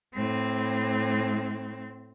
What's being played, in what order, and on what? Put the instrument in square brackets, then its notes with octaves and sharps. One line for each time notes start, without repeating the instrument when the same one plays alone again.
[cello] A2 C4